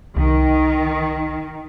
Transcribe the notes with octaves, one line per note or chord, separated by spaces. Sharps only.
C2 D#3